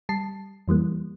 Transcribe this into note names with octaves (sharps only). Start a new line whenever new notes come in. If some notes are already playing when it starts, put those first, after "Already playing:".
G3 A5 C7
F2 E3 G3 A#3